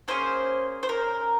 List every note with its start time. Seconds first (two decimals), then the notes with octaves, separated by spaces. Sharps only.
0.08 A#3 C#4 G#4 C5
0.83 C5
0.89 A#4